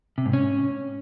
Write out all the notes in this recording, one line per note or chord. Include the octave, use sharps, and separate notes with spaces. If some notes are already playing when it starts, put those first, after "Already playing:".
C3
G#2
C#4